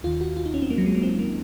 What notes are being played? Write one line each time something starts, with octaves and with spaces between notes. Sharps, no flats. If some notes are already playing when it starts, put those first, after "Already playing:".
D#2 D#3 F4
F#4
F4
D#4
C#4
C4
A#3
F#3
G#3
A#3
C4
A#3